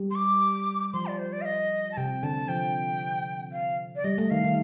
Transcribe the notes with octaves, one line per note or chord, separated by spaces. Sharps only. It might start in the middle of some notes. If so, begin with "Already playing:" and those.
Already playing: G3
C6
D6
F3 C6
D5
C5
D5
F5
D#5
A5
C3 G5
D3 A5
F3 G5
F5
D5
G3 D#5
A3
D#3 F5
D#3